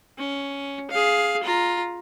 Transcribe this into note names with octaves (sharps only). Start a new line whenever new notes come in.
C#4
G#4 F5
F4 A#5